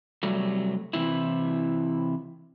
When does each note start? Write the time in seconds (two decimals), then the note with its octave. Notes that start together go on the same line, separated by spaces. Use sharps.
0.23 C3 F#3 G3 A3
0.93 C3 E3 E4